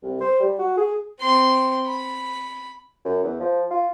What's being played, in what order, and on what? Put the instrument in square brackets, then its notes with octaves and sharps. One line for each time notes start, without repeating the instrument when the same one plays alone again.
[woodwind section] C2
C5
G3
F#4
G#4
[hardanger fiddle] C4 C6
B5
[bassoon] F#2
E2
F3
F4